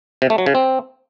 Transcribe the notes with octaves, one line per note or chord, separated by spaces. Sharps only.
C3
A3
F#3
C#3
C4